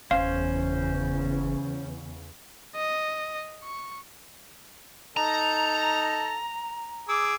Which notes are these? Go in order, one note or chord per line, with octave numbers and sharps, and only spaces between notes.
F#1 E2 C#3 C#4 C5 F5
D#5
C#6
D#4 A4 A#5
G#4 D6 E6